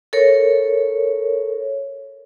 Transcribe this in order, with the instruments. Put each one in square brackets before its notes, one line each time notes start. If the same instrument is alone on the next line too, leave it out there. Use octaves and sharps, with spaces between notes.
[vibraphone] A4 A#4 C#5